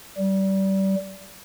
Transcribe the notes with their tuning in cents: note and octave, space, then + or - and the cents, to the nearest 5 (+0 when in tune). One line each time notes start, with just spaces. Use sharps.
G3 -25